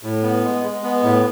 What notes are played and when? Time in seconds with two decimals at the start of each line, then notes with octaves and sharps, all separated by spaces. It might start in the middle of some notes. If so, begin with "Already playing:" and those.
0.03 A2
0.23 B3
0.44 G#3
0.64 G#3
0.83 B3
1.03 A2